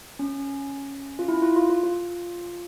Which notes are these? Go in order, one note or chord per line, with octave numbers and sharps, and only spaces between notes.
C#4
F4
E4
F4
F4
F4
F4